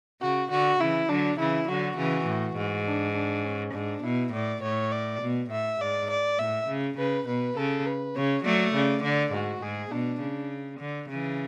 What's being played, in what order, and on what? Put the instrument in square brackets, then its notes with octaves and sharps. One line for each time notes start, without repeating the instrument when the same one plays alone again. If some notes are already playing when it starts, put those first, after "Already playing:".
[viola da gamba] C#3 [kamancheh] F#4
[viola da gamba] D3 [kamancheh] F#4
[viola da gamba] C#3 E3 [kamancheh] E4
[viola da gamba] D3 F#3 [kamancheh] D4
[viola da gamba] C#3 E3 [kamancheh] E4
[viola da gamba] D3 F#3 [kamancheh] F#4
[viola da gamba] C#3 E3
A2
G#2
[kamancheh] D4
D4
C#4
[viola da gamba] G#2 [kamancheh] D4
[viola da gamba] B2 [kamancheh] E4
[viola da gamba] A2 [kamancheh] D5
[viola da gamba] A2 [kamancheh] C#5
[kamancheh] D5
[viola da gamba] B2
[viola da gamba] A2 [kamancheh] E5
[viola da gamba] G#2 [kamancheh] D5
[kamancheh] D5
[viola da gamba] A2 [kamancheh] E5
[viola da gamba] C#3
[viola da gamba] C#3 [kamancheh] B4
[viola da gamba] B2 [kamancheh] B4
[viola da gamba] C#3 [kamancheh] A4
[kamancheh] B4
[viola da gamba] C#3 [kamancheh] C#5
[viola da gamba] F#3 A3 [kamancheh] D5
[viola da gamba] C#3 [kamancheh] D5
[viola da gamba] D3 [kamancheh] D5
[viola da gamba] G#2 [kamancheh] F#4
[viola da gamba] G#2 [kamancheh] G#4
[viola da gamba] B2 [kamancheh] D4
[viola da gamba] C#3
D3
C#3 E3